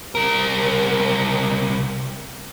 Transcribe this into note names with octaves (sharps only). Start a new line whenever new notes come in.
C2 A#4